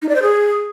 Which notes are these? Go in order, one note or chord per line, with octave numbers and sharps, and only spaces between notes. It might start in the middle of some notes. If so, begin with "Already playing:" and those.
D#4
D5
C5
G#4